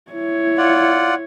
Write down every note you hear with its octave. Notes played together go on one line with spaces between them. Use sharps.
E4 C#5
F4 D5 F#5